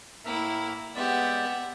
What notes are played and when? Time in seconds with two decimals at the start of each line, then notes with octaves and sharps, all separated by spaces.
0.25 A2 A#3 E4 A#4 E5
0.95 G#3 B3 G4 D5 E5 F#5